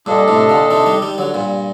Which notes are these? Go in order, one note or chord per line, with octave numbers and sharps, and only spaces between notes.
G2 A#2 D4 A4 D#5
A2 C3
A#2 D3
C3 D#3
D#3 G3
D#3 G3
D3 F#3
G2 A#2